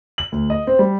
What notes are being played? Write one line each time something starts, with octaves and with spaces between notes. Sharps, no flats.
F#7
D2
D#5
C4
G3